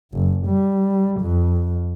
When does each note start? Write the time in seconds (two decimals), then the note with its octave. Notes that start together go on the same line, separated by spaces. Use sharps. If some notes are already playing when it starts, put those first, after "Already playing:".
0.13 F#1
0.47 G3
1.21 F2